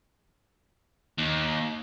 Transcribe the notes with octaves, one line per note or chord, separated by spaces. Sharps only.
D#2